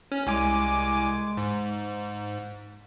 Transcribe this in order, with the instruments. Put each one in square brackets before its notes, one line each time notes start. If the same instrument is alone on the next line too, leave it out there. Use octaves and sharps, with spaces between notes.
[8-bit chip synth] C#4
[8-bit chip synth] C2 G#5 D6 [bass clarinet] G#3
[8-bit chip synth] G#2